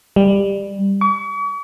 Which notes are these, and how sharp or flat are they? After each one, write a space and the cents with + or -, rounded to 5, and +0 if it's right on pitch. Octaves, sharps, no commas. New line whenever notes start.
G3 +15
C#6 +45